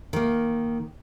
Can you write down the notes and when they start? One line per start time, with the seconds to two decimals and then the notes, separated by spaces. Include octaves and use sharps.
0.13 D#3 A#3